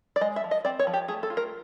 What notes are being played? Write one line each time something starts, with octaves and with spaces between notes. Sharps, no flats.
D5
G#3 D#5
E5
F3
D#5
C4 D5
C#5
F3
G4
A3 G#4
A4
F4
A#4